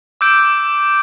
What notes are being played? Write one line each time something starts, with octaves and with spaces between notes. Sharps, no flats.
D6 E6 G6 D7